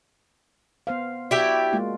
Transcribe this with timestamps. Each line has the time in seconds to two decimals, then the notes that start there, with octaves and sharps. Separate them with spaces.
0.87 B3 C5 F5
1.31 E4 F#4 G4 D5 E5
1.73 G#3 A#3 F4